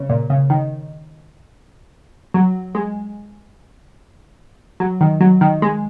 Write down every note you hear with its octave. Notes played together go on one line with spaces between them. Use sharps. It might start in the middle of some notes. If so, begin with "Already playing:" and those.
Already playing: C#3
A#2
C#3
D#3
F#3
G#3
F#3
D#3
F#3
D#3
G#3